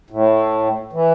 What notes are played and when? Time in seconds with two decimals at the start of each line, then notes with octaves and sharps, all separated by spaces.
0.10 A2
0.93 E3